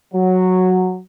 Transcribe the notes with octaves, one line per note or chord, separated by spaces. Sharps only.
F#3